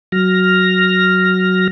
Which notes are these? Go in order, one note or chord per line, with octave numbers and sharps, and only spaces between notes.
F#3 F6 A#6